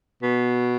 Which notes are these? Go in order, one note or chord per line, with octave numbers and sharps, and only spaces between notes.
B2